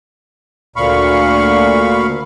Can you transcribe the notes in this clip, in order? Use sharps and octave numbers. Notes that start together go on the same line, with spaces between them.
D2 A#2 F5 B5 C#6